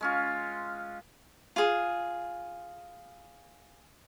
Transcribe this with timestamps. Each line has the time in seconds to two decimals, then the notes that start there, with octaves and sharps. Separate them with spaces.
0.01 G#3 C#4 F4
1.56 F4 G#4